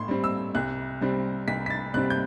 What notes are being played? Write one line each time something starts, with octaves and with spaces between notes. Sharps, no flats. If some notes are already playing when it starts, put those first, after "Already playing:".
Already playing: A2 C6
G3 C4
E6
C2 F#6
C3 G3 C4
C2 B6
B6
A6
C3 G3 C4 F#6
G6